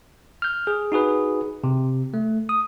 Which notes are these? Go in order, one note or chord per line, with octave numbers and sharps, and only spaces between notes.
F6 G6
G#4
D#4 F#4 G#4 B4
C3
A3
D#6